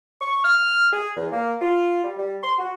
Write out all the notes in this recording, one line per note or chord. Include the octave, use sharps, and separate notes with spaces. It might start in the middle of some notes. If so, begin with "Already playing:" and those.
C#6
F6
G#4
E2
A#3
F4
G3
G3
C6
F#4